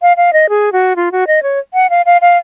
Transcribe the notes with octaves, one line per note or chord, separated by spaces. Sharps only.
F5
F5
D#5
G#4
F#4
F4
F#4
D#5
C#5
F#5
F5
F5
F5